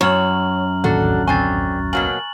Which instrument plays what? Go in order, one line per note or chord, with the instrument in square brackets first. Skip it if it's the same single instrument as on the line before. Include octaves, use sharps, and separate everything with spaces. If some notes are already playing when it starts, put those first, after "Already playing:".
[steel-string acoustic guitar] F#2 [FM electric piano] C#5 [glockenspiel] A#5 F6 F#7
[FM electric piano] A1 D#2 [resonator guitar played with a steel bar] D4 F#4 A4 [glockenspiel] F#6
[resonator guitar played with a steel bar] D3 C4 G#5 [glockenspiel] C#6 A6
[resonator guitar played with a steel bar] B2 F#3 A#3 [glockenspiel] G#5 F#7